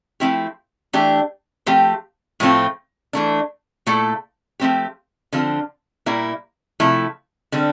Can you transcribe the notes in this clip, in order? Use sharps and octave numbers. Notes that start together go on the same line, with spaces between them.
F3 A3 C4 E4 G4
E3 A3 D4 G4
F3 A3 C4 G4
A2 F3 A3 C4 F4
E3 A3 D4
A#2 A3 E4 A4
F3 A3 C4 G4
D3 F3 C4 F4
A#2 G3 A#3 E4
C3 F3 A3 E4
D3 G3 C4